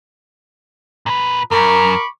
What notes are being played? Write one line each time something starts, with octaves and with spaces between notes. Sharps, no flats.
A#2 B4
F#2 A#4 B5 C#6 D6